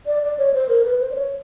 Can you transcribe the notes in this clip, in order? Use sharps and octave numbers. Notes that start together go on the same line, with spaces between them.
D5
D5
C#5
C5
A#4
B4
C5
D5
C#5